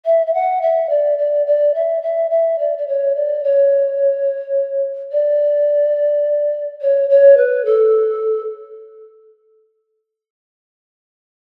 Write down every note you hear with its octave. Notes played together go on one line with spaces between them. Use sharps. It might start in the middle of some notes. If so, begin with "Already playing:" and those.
E5
E5
F#5
E5
D5
D5
D5
E5
E5
E5
D5
D5
C#5
D5
C#5
D5
C#5
C#5
B4
A4